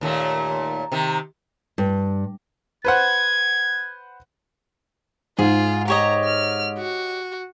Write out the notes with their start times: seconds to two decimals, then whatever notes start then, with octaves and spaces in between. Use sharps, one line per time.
0.01 D#2 A#2 A3
0.92 C3 D#3
1.78 G2
2.85 B4 C5 F#5 G#6
5.39 G#2 F4 G#4
5.88 G4 C#5 D#5 A#5
6.25 F6
6.78 F#4